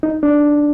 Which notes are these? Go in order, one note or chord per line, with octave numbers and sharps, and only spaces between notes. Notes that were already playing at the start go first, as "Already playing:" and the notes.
D#4
D4